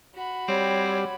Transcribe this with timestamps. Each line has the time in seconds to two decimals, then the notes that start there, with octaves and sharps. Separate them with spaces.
0.15 F#4 B5
0.48 G3 C4 C#5